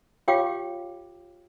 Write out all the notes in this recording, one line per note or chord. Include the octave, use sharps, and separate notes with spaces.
F4 G4 C#5 F5 G5 D6